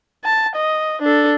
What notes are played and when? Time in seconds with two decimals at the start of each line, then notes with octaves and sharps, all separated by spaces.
0.25 A5
0.56 D#5
1.02 D4 A4